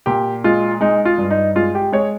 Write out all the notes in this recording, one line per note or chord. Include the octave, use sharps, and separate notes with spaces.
A#2 G4
G#3 F4
G#3 D#4
F4
G2
D#4
G#3 F4
G4
G#3 C#5